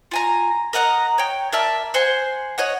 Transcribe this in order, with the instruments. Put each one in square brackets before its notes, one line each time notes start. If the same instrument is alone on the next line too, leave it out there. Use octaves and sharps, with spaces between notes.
[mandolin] F4 G#5 A#5
A#4 D#5 F#5 A#5
C#5 G5
A#4 D5 E5 A5
C5 F#5 G#5 C6
C#5 D#5 F#5